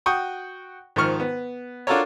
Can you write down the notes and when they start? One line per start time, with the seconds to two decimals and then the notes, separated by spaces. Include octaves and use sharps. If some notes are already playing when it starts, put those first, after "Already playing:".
0.06 F#4 G5 C#6 D#6
0.96 G#2 D#3 F3 C#6 F6
1.20 B3
1.87 D4 F4 F#4 A4 A#4 C#5